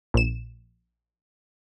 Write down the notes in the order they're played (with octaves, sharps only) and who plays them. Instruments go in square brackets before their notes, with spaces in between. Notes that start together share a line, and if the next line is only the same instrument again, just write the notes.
[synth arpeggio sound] A#1 E7